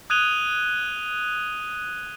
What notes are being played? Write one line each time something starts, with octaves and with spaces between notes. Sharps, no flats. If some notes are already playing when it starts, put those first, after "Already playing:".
D#6 F#6 G#6 D#7 F7 G7